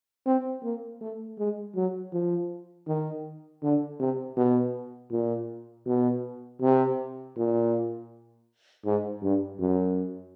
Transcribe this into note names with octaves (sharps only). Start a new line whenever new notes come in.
C4
A#3
A3
G#3
F#3
F3
D#3
D3
C3
B2
A#2
B2
C3
A#2
G#2
G2
F#2